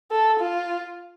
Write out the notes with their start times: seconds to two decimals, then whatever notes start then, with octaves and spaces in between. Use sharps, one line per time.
0.11 A4
0.40 F4